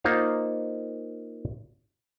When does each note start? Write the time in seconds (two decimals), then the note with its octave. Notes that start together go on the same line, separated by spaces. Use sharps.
0.04 A#3 D#4 F4 C5 F5